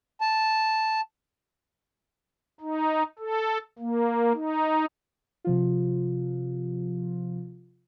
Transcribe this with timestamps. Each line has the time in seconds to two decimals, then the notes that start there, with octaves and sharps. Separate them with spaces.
0.21 A5
2.61 D#4
3.19 A4
3.79 A#3
4.34 D#4
5.44 C3 F3 F4